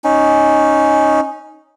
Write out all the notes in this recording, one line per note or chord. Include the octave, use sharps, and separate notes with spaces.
C#4 D#4